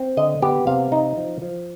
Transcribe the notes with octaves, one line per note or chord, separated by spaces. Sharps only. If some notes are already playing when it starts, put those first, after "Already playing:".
Already playing: C4
D3 D#5
B3 G4
C3 F5
D#4
F3
F3